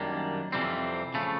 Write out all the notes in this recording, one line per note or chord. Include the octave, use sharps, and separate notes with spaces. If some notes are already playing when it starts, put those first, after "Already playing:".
Already playing: F#2 D#3 G3 A#3 D4
F2 C3 E3 G3 C4
C#3 F3 A3